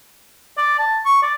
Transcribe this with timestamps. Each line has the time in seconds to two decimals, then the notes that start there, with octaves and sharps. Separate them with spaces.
0.58 D5
0.78 A5
1.06 C#6
1.23 D5